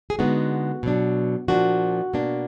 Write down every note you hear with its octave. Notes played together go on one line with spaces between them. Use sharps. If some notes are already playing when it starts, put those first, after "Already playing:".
G#4
D3 G#3 B3 D#4 F#4
B2 F#3 D4
A#2 F3 A#3 D4 F#4
B2 A#3 D4